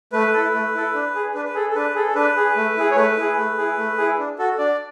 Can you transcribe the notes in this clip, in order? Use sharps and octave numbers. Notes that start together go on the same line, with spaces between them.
A3 B4
E4 A4
A3
E4 A4
D4
G#4
D4 B4
B4
G#4 A4
A4
D4 B4
G#4 A4
D4 B4
G#4
A3
E4 G#4
C#5
A3 B4
E4 G#4
A3
E4 G#4
A3
E4 G#4
D4
F#4 A4
D4 D5